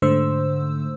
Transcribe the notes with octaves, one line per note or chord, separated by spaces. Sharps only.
G#2 D3 A3 C5 E6